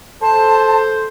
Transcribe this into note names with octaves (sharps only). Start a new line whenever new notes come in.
A4 C5 A5